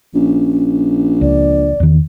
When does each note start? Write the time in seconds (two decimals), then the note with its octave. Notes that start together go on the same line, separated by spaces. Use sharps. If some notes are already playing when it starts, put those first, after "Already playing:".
0.14 A#1 C#4
1.21 C#2 D5
1.80 E2 D#3